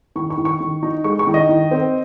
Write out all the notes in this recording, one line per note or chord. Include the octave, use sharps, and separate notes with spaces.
D#3 C#6
C#6
D#3
C#6
D#3
D#4
G#3 C#6
C#6
D#3
D#5
D#3
C4